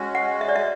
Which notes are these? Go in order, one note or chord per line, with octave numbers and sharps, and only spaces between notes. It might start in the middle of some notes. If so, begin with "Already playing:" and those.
Already playing: G#3 C#4 F#4
F#5
E5
D5
E5